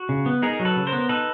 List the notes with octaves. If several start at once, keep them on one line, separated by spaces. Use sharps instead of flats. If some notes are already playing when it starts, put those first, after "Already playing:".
Already playing: F#4
C#3
B3
D#4 G#4 A#4
F#3
A4 B4
C#3
A#4 C5
B3
D#4 A4 B4